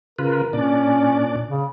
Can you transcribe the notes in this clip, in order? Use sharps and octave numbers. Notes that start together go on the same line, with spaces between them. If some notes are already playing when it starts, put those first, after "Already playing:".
C#3 F4 A#4 B4
A#2 C#4 D4 D5
C#3